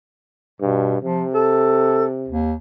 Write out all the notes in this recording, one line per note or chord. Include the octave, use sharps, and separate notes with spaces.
G2 B2
C3 F3
A4
D#2